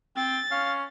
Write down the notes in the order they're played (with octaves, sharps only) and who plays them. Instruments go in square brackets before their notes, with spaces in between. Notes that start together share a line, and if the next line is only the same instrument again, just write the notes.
[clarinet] C4 [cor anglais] G5 [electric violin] A6
[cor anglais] C#4 [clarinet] F5